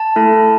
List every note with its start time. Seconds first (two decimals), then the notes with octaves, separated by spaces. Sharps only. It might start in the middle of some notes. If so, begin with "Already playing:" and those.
Already playing: A5
0.16 A3 E4 A4